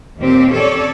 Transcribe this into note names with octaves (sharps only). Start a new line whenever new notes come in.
D#2 A#2 C4 G4
C#4 A4 C#5 D5